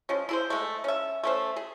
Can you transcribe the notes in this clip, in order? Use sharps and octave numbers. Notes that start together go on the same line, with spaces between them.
F3 G#3 C#4
E4 G#4 C5
G#3 A3
C#4 E5
A3 C#4 C5
G#4